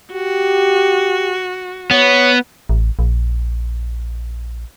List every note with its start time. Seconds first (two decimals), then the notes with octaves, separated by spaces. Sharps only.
0.13 F#4 G4
1.91 B3 C#5
2.69 A1
2.99 A#1